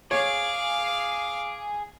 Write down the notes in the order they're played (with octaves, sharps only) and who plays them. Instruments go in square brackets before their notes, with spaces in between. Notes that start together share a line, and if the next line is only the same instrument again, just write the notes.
[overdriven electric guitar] G#4 [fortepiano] C#5 [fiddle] F5 [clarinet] D6